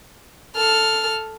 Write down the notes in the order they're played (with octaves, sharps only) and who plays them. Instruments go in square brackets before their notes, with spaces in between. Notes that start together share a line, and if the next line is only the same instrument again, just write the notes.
[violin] A4 F6